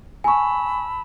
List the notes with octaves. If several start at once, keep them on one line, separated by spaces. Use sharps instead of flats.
G#5 A5 B5 C#6 E6